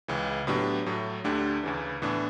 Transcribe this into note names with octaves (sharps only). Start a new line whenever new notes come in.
C#2 C#3 E3
A2 F#3 B3 D4 G4
A2 F#3 A3
D2 D3 A3 D4 G4
D2 C#3 E3
A2 E3 B3 D4